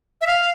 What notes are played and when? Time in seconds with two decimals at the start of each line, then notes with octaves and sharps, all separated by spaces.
0.21 E5
0.27 F5